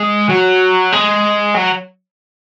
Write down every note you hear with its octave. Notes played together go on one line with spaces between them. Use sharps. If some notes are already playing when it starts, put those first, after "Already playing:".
Already playing: G#3
F#3
G#3
F#3